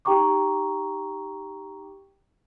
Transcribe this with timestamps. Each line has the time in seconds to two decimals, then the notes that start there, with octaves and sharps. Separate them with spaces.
0.05 D#4 G4 G5 A#5 C#6 D6